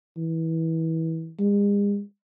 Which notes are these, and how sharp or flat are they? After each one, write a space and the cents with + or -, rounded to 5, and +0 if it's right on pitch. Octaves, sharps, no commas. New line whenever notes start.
E3 -25
G#3 -45